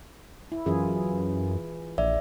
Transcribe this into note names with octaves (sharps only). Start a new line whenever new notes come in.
E4
F#2 E3 F4 G#4
A#1 D5 E5